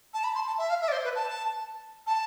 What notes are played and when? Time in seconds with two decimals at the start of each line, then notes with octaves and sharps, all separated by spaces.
0.13 A5
0.24 B5
0.35 C6
0.47 A5
0.58 E5
0.70 F5
0.81 E5
0.88 D5
0.92 C5
1.04 B4
1.15 A5
2.06 A5